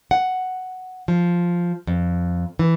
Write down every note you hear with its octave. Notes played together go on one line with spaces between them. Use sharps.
F#5
F3
F2
E3